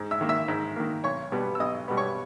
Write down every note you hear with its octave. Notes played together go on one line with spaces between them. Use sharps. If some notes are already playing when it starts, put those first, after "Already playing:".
Already playing: G#2
E5 E6
D#3 A#3
E5 E6
G#2
D#3 A#3
B1 C#5 C#6
B2 G3 B3
E6
B1 D#5 D#6
B2 G3 B3
C#5 C#6